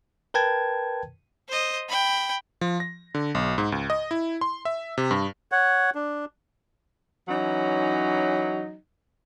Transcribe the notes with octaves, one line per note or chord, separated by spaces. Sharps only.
A#4 B4 G5 A5 G#6
C5 D#5
G5 B5
F3
A#6
D3
B1
G#2
C#2
D#5
E4
C6
E5
C3
G2
C#5 F#5
D4
E3 F#3 C#4 D#4